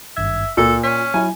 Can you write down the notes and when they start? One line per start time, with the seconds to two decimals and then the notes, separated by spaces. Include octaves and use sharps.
0.17 G#1 G2 E5 G#6
0.57 C#2 A#2 A4
0.84 C#4 B6
1.14 F#3 E4 G#5